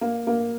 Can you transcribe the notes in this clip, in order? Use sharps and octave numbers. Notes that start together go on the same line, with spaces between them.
A#3
A#3